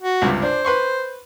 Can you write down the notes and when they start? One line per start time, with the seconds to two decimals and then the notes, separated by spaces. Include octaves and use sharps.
0.02 F#4
0.22 C#2 G2 C3
0.42 D4 C5
0.65 B4 C6 C#6